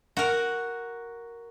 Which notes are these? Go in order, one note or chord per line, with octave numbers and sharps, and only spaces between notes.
F#4 A#4